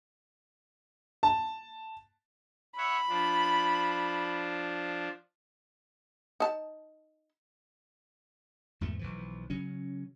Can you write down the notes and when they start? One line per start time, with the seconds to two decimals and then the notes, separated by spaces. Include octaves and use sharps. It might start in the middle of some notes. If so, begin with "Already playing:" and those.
1.23 A5
2.78 C#5 E5 F#5 B5
3.09 F3 D4
6.40 D#4 A5
8.81 E2 G#2 B2 A3
8.99 B1 E3 F3
9.50 C#3 F#3 C#4